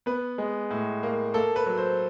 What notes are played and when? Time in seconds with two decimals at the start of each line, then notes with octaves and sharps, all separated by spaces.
0.06 B3 B4
0.38 G#3
0.71 A2
1.03 A#3
1.34 A#3 A4
1.56 B4
1.66 F#3
1.78 C5